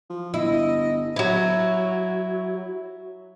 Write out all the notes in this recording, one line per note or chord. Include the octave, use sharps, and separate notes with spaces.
F3
G1 E4 D#5
F#3 E4